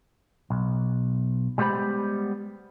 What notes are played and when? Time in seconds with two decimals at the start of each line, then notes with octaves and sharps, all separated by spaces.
0.50 B1
1.58 G3 G#3 B3 G4 C5 B5